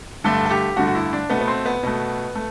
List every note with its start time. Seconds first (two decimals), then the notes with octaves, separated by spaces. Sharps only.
0.24 G2 D3 A3 A4
0.46 A4
0.51 G4
0.76 G2 D3 A3 F#4
0.88 F#4
0.95 E4
1.13 D4
1.30 B2 A3 B3
1.41 B3
1.48 C4
1.66 B3
1.83 B2 A3
2.35 A3